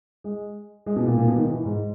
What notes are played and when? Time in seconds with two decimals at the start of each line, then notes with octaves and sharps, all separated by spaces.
0.24 G#3
0.86 G#3
0.96 B2
1.07 A#2
1.18 A#2
1.28 B2
1.38 D#3
1.49 E3
1.65 G#2